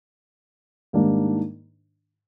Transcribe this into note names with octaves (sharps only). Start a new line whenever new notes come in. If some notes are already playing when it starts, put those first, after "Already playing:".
G#2 D#3 G3 A#3 D4